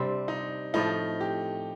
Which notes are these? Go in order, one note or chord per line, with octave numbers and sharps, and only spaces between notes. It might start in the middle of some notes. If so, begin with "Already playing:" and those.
Already playing: C3 G3 C4 D4
D#4
A2 F3 A3 D#4
G4